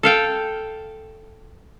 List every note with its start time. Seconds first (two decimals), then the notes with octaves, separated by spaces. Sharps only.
0.03 A4 F5 G5